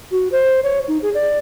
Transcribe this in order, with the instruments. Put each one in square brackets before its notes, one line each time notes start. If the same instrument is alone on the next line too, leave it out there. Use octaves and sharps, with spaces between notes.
[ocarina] F#4
C5
C#5
D#4
G#4
D5